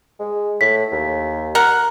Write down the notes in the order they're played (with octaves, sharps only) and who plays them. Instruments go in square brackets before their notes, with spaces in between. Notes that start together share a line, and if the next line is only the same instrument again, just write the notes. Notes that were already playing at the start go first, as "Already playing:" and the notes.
[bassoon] G#3
[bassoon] A2 [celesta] B6
[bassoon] D#2
[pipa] A#4 F#5